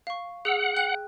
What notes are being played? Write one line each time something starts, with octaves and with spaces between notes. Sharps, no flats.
F5 C#6
G#4 F#5 E6
G5 F#6